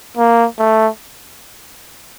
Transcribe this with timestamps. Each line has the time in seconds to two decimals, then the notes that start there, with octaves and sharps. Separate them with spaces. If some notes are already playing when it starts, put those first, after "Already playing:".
0.17 A#3
0.59 A3